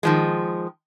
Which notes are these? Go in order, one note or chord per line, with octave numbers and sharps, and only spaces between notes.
D#3 F3 G#3